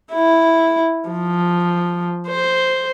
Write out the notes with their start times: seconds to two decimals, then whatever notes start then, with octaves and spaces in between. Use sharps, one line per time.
0.12 E4
1.09 F3
2.27 C5